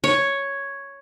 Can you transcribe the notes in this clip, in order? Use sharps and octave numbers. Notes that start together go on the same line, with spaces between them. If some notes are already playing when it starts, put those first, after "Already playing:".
C#5